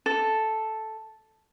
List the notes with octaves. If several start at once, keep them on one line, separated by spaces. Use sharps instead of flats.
A4